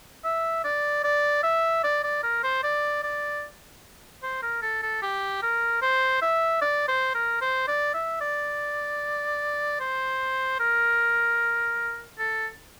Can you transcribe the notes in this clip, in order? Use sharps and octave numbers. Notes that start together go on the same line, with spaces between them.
E5
D5
D5
E5
D5
D5
A#4
C5
D5
D5
C5
A#4
A4
A4
G4
A#4
C5
E5
D5
C5
A#4
C5
D5
E5
D5
C5
A#4
A4